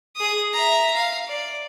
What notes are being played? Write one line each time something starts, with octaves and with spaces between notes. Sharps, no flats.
G#4 D#6
E5 A#5
F5
D5